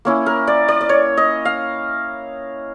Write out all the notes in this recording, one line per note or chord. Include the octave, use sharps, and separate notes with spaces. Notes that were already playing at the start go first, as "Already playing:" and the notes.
A#3 C#4 E4
A#4
D5
D5
D5
C#5
D#5
F5